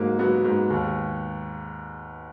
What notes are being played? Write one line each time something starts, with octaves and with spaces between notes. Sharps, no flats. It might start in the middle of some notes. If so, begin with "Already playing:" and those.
Already playing: G#2 F#3 A#3
F#3 B3
G#2
D#2